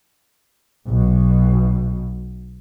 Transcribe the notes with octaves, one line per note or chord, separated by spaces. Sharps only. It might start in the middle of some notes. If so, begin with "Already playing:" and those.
B1 B2